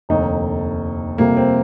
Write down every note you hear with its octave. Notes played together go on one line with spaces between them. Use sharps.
F1 D#2 D3 D#4
F2 C3 G3 A#3
C4